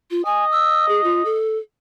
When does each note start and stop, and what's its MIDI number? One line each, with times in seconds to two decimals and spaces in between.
0.11 0.24 65
0.25 1.35 75
0.25 0.45 80
0.52 0.88 88
0.88 1.01 68
1.04 1.23 65
1.25 1.58 69